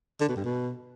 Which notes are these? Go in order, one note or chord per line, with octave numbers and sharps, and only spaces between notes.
D3
B2
G2
B2